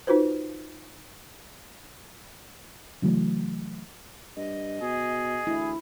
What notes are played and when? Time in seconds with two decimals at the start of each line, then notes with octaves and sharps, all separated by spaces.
0.07 D#4 F4 F#4 B4 C5
3.02 C#3 E3 F#3 A3
4.36 G2 D#5
4.81 B2 G#4
5.47 D2 E4